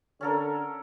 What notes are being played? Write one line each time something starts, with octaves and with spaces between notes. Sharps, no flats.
D3 C#4 A4 A#4